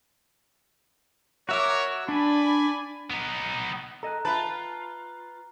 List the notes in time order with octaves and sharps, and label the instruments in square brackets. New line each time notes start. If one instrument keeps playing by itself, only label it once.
[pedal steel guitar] F#4 E5 D6 [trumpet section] A#4 C#5
[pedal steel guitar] D4 [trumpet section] D5 G#5 B5
[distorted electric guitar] B3 D#4
[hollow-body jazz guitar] A4 D#5 G#5 [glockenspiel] A#5 F#6
[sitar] F4 B4 [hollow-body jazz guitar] E5 G5 A5 [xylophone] B5